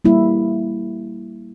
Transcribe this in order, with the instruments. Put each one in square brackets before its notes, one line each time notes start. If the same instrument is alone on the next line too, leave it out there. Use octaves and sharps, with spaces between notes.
[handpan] G3 A#3 E4